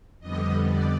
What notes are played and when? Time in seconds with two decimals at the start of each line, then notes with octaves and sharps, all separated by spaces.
0.20 F2 D3 G3 B3 D#5
0.67 D5